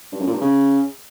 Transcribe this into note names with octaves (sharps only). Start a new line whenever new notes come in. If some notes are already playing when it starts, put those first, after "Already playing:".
G2
F#2
A#2
G2
C#3